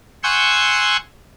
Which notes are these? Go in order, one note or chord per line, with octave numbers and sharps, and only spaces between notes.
F#5 G#5 C6 C#6 E6 G6